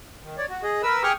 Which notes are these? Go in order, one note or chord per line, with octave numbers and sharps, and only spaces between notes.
D#3
C#5 D5
F#4
G#4 D#5
A#4 B4 E6
G4 G#4 G5 C#6 D#6 F6